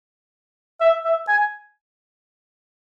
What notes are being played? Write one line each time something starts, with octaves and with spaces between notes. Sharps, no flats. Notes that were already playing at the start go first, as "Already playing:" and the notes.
E5
E5
G#5